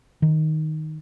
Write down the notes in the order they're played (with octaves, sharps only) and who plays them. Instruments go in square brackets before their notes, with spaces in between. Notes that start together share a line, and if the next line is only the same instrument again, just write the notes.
[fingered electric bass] D#3